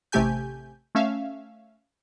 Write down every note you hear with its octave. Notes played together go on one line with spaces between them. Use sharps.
A1 C3 A3 G4 G#5 G6
A3 C#4 E5 F5